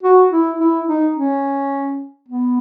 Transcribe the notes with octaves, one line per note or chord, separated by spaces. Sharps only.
F#4
E4
E4
D#4
C#4
B3